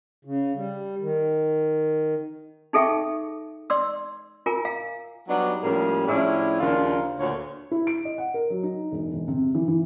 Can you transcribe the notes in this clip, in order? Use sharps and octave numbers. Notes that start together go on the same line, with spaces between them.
C#3
G3
D#3
D#4 G#4 A4 E5 G5 C#6
D5 C6 E6
F4 A#4 G#5 A#5
F5
F#3 G3 B3 D4 D#4
A2 F3 G3 A#3 C#4 G#4
A2 F3 C#4 D4 E4 G#4
D#2 C#3 F3 A#3 D4 F4
D2 A#2 C#5
E4
D7
D#5
F#5
A#4
F#3
D#4
E1
E1
C3
E3
E3